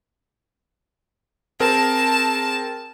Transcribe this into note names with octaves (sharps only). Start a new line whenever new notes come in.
C4 G#4 A#4 A5